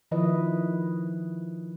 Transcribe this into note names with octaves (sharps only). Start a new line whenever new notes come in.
D#3 F3 E4 B4 D#5